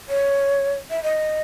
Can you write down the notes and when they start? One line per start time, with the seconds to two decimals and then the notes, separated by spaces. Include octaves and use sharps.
0.09 C#5
0.90 E5
1.03 D#5